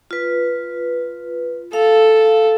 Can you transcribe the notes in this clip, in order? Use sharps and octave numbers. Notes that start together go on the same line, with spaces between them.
F4 B4
A4 F5